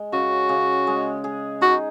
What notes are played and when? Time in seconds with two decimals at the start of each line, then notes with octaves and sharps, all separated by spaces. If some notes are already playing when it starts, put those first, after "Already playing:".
Already playing: G#3
0.12 C#3 F#4
0.49 C#3
0.87 G#3
1.24 G#4
1.61 D#4 F#4